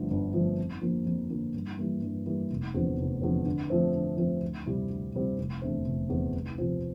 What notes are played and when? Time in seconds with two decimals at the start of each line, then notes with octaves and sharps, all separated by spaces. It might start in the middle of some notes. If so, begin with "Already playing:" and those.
Already playing: G1 G2 D3 F3 A3
0.10 G1
0.34 G2 D3 F3 A3
0.58 F2
0.81 D3 F3 A#3
1.06 F2
1.30 D3 F3 A#3
1.54 G2
1.79 E3 G3 A#3
2.02 G2
2.26 E3 G3 A#3
2.51 F1
2.74 E2 D3 F3 C4
2.98 F1
3.22 E2 D3 F3 C4
3.45 D3
3.70 F3 A3 C4
3.95 D3
4.17 F3 A3 C4
4.42 D2
4.66 C3 G3 C4 E4
4.90 D2
5.14 C3 G3 C4 E4
5.38 F1
5.62 E2 D3 A3 C4
5.86 F1
6.09 E2 D3 A3 C4
6.34 C2
6.58 C3 F3 C4 F4